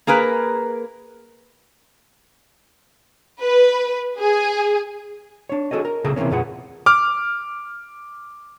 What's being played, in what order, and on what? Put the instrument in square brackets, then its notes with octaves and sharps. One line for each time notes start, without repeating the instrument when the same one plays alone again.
[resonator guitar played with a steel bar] A#3 G#4 A#4 B4
[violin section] B4
G#4
[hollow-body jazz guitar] D4 C#5
F#4 G#4 A4 C#5 D#5
A#4
B1 A#2 C#3 G#4 A4 A#5
C3 E3 F#3 A#3 C#4
F2 A#2 F4 G#4 B4 F#5
[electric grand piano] D6 F6